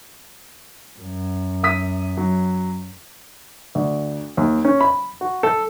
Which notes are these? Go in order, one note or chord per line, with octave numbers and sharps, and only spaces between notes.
F#2
E5 D#6 B6
F#3
D2
D#2
C#4
B5
F#4
A4